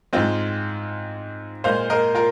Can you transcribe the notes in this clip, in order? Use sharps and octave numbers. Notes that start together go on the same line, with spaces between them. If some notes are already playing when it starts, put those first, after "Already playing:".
G#2 G#3 C4 F4
A#2 G#3 C5 F5
A#4 D#5
F4 A#4